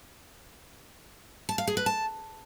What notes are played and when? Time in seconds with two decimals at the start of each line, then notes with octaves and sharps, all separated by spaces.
1.49 A5
1.58 F5
1.67 G#4
1.77 B4
1.86 A5